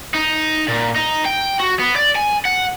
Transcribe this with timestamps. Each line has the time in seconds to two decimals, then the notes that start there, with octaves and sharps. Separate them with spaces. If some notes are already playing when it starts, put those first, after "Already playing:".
0.15 D#4
0.68 A#2
0.96 D#4
1.25 G5
1.60 F#4
1.79 B3
1.96 D5
2.15 G#5
2.45 F#5